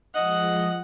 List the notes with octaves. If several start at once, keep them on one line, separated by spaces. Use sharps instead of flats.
F3 G#3 D#5 F#5